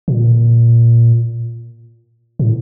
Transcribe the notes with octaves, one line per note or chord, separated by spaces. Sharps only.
A#2
A2